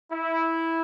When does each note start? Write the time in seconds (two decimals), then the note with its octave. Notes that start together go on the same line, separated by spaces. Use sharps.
0.12 E4